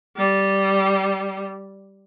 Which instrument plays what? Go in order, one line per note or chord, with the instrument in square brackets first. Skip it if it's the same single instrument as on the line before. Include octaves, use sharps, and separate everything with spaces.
[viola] G3